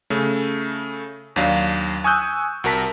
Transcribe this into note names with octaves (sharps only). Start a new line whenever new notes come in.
C#3 A3
D#2 F#3 D4 F5
G#5 C#6 D#6 E6 F#6 G6
C2 F#4 A#4 A5 B6